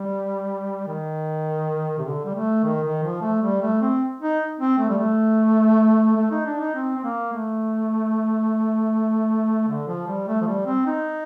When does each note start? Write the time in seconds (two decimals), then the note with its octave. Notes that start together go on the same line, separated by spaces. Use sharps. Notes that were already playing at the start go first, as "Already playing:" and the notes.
Already playing: G3
0.87 D#3
1.98 C3
2.05 D3
2.24 G3
2.35 A3
2.63 D#3
2.83 D#3
3.03 F3
3.22 A3
3.42 G3
3.62 A3
3.81 C4
4.21 D#4
4.59 C4
4.78 A3
4.89 G3
4.98 A3
6.16 A3
6.31 D#4
6.46 D4
6.60 D#4
6.75 C4
6.98 C4
7.04 A#3
7.33 A3
9.68 D3
9.88 F3
10.07 G3
10.28 A3
10.41 F3
10.47 G3
10.66 C4
10.86 D#4